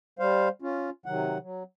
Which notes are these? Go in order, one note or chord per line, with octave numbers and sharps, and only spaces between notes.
G3 C5 F5
C#4 F4
C3 D#3 F#3 F#5
F#3